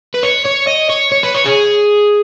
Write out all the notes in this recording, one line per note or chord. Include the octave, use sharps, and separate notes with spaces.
B4
C#5
C#5
D#5
C#5
C#5
B4
C#5
G#4